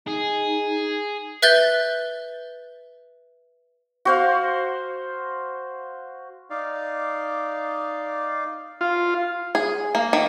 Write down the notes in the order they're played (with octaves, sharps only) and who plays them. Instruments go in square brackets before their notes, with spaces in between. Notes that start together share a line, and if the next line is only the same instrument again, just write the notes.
[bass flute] D#4 [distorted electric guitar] G#4
[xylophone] B4 E5 F#6 G6 A6 G7
[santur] F#4 C5 F5
[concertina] D#4 D5 F5
[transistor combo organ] F4
[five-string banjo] G#4
A#3
D#3